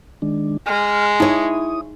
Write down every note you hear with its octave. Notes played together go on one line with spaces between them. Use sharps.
D#3 G#3 D4
G#3 F6
D#4 E4 C#5 D#6